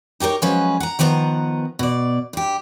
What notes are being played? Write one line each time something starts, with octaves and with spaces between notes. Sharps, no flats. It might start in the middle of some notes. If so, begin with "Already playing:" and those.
D#4 G4 A4 A#4 C#5
F3 F#3 G#3 C#4 B4
F#5 A#5
D#3 F3 B3 C#5 F#5 A#5
B2 D5
G2 G4